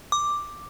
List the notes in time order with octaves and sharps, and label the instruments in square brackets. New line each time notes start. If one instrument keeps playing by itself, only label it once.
[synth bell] D6